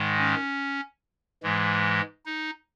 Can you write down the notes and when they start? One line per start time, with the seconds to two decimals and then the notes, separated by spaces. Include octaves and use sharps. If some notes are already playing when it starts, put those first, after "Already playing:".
Already playing: G#2 D#3 G#3
0.18 C#4
1.43 G#2 E3 G#3
2.26 D#4